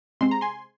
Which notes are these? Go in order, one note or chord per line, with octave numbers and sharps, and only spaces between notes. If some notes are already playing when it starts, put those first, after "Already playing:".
C3 G#3 C4 C6
A#5
G#5 C6